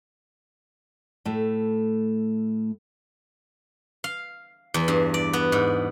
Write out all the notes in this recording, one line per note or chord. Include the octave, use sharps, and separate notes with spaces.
A2 A3
F5
E2
G2
D5
B3
G#2